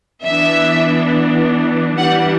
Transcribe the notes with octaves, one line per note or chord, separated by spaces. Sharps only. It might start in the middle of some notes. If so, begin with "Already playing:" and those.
E3 B3 D4 E5
E3 G3 D4 F#5